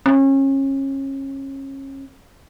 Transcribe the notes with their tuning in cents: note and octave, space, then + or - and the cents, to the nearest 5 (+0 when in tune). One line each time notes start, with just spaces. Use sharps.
C#4 -30